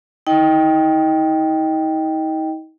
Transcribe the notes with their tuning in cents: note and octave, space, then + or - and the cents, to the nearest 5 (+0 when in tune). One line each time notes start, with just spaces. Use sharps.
D#4 +40 D#5 +0 G5 +0